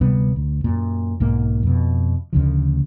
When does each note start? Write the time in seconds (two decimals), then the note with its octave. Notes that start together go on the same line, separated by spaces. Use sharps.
0.01 D1 C3 G3 B3
0.36 D2
0.64 F#2 A#2
1.20 B1 G#2 A#3
1.63 F2 B2
2.33 D2 C#3 F3